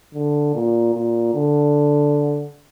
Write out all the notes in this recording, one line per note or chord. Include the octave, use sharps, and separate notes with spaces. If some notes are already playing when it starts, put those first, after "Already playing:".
D3
A#2
A#2
D3